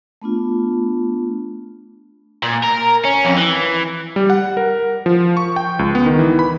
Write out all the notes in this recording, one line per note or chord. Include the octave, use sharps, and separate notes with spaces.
A3 B3 D4 F4
A#2
A#4
C#4
F2
E3
G3
F#5
A#4
F3
C#6
G5
C#2
B3
D#3
E3
B5